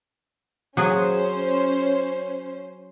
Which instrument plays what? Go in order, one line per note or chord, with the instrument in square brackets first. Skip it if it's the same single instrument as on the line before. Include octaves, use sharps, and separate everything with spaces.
[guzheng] F#3 G#4 [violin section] C#4 C5